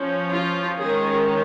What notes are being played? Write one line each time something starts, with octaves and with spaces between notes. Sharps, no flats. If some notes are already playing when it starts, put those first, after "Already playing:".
Already playing: F3 C#4
F4
D#3 G#3 C#4 G#4